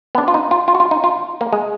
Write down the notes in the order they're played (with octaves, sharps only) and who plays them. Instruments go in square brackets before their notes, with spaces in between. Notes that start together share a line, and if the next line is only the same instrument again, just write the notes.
[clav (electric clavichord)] B3
D4
F4
D#4
F4
F4
F#4
F4
D#4
F4
A#3
G#3